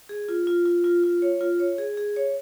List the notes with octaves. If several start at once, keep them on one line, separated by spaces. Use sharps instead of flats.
G#4
F4
F4
F4
F4
F4
C#5
F4
C#5
G#4
G#4
C#5